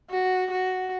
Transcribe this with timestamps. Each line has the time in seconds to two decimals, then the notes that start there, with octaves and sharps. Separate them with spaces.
0.10 F#4
0.51 F#4